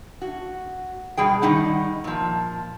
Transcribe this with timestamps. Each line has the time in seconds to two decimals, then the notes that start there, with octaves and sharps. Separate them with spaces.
0.22 F#4
1.17 B2 G3 G#4 G5
1.42 D#3 G3 D#4 F#5
2.04 A#2 F3